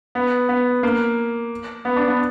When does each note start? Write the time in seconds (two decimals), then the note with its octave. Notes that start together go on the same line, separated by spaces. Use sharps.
0.15 B3
0.49 B3
0.83 A#3
1.85 B3
1.96 D4
2.08 B3